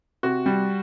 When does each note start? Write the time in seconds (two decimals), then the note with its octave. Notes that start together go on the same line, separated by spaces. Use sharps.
0.23 C3 F#4
0.46 G3